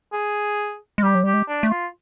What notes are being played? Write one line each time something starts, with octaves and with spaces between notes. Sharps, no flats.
G#4
G#3
G3 G4
F#3
G3 G4
G#3
D4
A3
F4